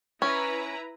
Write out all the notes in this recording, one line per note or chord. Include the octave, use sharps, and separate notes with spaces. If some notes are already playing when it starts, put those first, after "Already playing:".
C#4 E4 B4 A#5